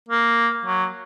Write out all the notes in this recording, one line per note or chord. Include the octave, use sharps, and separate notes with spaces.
A#3
F#3